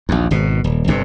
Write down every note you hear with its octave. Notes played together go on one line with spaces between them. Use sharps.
A#1 D#2
G#1 B2
D#1
G1 G2 C3